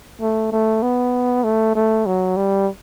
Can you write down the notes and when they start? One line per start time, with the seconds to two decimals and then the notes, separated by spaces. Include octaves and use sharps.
0.21 A3
0.52 A3
0.82 B3
1.44 A3
1.75 A3
2.06 F#3
2.37 G3